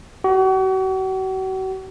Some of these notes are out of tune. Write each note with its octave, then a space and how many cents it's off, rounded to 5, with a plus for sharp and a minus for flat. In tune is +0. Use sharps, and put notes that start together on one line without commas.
F#4 +40